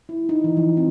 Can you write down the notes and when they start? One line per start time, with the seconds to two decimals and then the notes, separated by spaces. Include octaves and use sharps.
0.09 E4
0.29 D#4
0.44 E3
0.57 F3
0.77 C4